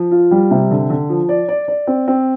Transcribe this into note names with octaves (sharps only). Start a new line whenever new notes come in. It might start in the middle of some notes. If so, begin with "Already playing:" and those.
Already playing: F3
F4
G3
C3
D3
D3
F3
D5
D5
D5
C4
C4